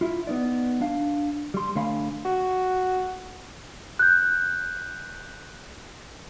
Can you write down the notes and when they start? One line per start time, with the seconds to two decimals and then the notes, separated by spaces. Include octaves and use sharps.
0.01 E4 F4
0.27 B3 D#4 D5
0.81 D4 F5
1.54 G3 C6
1.75 D3 A3 C#5 F5 G#5 B5
2.25 F#4
3.99 F#6 G6